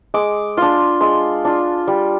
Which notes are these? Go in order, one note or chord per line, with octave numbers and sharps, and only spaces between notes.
G#3 D6
D4 F4 C6
G#3 C6
D4 F4
G3